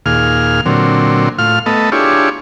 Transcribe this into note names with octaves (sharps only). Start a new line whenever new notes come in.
D#2 A#2 G#4 F5 F6
A#2 D3 F#3 C4
A2 F4 F5 F6
A3 B3 A4 D#5
D4 E4 F4 G4 G#4 C#5